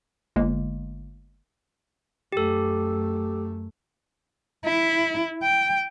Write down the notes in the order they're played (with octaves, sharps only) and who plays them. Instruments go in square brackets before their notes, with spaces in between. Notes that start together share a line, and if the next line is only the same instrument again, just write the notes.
[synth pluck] G1 G#3 A#3
[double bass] F#2 A3 [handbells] G4 A4
[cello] E4
G5